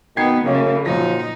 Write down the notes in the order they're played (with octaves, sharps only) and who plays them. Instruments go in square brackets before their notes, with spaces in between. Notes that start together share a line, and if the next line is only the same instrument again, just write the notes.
[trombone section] B2 D#3 D#4 [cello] B3 [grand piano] G5 G#6 C7
[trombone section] F#2 A2 A#3 [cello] C#3 [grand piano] C#5 D#5
[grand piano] A#2 A#6 [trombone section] F3 F#3 [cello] D#4